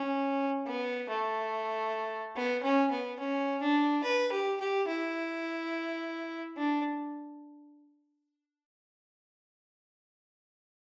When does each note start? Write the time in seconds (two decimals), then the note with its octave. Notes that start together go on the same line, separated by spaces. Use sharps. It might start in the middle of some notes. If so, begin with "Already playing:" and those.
Already playing: C#4
0.66 B3
1.09 A3
2.36 B3
2.63 C#4
2.91 B3
3.19 C#4
3.61 D4
4.04 B4
4.32 G4
4.60 G4
4.88 E4
6.57 D4